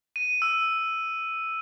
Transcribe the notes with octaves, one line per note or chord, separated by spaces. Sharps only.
D#7
E6